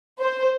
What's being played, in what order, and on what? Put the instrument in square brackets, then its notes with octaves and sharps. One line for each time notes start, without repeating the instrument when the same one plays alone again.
[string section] C5